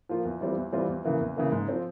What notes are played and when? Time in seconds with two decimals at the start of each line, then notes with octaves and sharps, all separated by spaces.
0.09 F3 A#3 F4
0.25 E2
0.41 E3 G3 C4 F4
0.57 E2
0.73 E3 G3 C4 F4
0.89 E2
1.05 C#3 E3 A#3
1.21 E2
1.37 C#3 E3 A#3
1.52 G#2
1.68 F3 C4